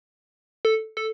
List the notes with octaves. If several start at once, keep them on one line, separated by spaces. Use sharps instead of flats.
A4
A4